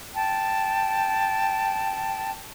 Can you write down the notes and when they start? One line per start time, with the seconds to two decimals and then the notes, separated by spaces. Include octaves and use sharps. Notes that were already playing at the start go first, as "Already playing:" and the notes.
0.14 G5 A5